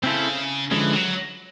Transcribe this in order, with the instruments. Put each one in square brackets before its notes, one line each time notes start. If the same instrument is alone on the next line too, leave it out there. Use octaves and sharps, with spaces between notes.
[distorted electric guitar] C#3 [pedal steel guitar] C4 E4 A4 C5
[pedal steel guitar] D3 F3 G#3 C#4 [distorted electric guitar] E3
[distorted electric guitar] F#3